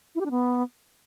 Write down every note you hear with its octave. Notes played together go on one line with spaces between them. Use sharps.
E4
G4
D4
B3